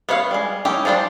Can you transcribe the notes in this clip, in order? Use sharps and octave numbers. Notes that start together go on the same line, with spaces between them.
B3 B4 C#5 E5 F5
G3 G#3
C#4 D#4 E4 G4
F3 G3 D4 C5 D5